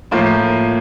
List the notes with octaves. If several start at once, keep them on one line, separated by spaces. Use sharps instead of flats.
A2 F3 A#3